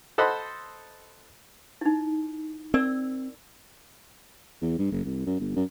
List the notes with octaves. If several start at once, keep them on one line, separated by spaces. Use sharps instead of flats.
A4 C5 D#5 F#5 B5
D#4 E4
C4 A#4 D5 E6
E2
G2
F#1
C2
F#2
G1
F#2